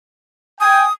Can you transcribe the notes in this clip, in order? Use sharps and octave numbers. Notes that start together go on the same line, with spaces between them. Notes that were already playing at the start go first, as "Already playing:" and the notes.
G5 G#5 D#6